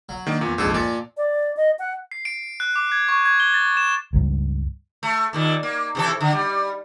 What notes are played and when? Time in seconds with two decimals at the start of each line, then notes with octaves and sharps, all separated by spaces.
0.09 F#3
0.27 D#3 A#3 D4
0.41 E2 A#2
0.58 A#1 F2 G#2 G#4 A4
0.74 A#2 D5 A5
1.17 D5
1.57 D#5
1.79 F#5
2.11 C7
2.25 D7
2.60 F#6
2.76 D6
2.92 G#6
3.09 C#6
3.25 G#6
3.40 G7
3.54 A6
3.77 E7
4.13 C#2 G2
5.03 A3
5.33 D#2 A#2 D#3
5.63 A#3
5.95 C3 E3 A4
6.21 D3
6.33 G3